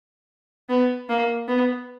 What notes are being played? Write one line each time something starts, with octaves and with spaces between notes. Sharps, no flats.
B3
A#3
B3